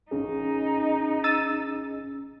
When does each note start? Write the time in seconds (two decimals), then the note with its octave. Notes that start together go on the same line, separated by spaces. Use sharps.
0.11 A1 C#4 D#4 G#4
1.24 E6 A6 D#7